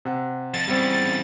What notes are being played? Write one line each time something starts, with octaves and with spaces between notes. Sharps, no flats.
C3 F#5
F2 A6 E7
E2 C#3 G3 C4